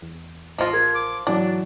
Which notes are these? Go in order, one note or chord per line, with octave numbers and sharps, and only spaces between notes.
E2
A1 F3 F4 D#5
A#4 G#6
D6
G#2 E3 F#3 D4 D5